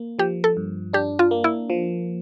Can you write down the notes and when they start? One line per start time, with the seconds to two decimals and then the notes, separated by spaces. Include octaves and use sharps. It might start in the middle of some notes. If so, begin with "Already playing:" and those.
Already playing: A#3
0.19 F3 G4
0.44 A4
0.57 G2
0.93 D4 G4
1.19 F4
1.31 A#3
1.44 E4
1.70 F3